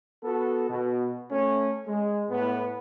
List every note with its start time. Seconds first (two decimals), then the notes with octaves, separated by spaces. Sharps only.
0.24 B3 F#4 A4
0.70 B2
1.32 A3 C#4
1.87 G#3
2.30 A2 B3